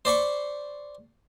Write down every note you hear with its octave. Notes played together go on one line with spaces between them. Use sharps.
C5 D5 B5 C#6